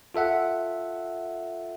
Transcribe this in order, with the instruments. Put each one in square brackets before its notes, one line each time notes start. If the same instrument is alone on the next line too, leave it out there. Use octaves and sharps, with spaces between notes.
[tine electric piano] F4 A4 E5 F#5